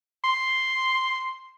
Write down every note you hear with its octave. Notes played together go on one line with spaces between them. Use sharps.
C6